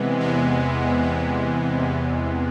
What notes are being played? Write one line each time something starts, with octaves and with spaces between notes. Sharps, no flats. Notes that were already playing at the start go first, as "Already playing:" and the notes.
Already playing: E2 C3 E3 G#3 B3
E2 C3 E3 G#3 B3
E2 C3 E3 G#3 B3
E2 C3 E3 G#3 B3